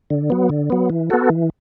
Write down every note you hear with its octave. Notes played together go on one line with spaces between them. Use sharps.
D3
F#3 B3
D3
F#3 B3
E3
B3 F#4 A4
E3